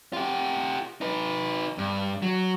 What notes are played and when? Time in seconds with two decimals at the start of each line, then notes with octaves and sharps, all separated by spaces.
0.13 F4 G4
1.01 D#4 B4
1.78 G2
2.22 F#3